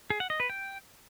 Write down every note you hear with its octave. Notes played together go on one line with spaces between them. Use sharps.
G#4
F#5
D#5
B4
G5